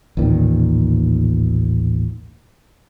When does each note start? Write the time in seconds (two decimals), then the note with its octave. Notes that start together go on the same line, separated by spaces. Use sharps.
0.17 A1 D#2 A#2 D#3